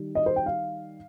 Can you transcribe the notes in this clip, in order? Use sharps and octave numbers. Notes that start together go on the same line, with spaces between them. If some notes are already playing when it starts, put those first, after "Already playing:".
Already playing: D#3 G3
D#5
C5
G5
F5